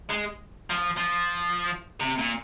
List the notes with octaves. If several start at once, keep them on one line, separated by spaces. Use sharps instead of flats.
G#3
F3
F3
C3
A#2